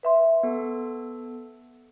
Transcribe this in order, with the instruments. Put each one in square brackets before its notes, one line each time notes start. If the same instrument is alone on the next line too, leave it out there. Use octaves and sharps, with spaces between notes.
[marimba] B4 E5 C6
[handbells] B3 A4